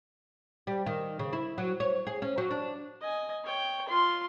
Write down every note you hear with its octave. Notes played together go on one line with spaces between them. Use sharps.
G3
D#3
C#3
E4
F#3
C#5
G#4
C#4
F#3
D4
D#5 G#5
C#5 G5
F4 C6